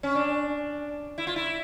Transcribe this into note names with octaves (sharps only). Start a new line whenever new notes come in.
C#4
D4
E4
F4
E4